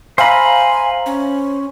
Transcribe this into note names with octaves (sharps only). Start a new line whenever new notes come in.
C5 E5 F5 G#5 A#5 B5
C#4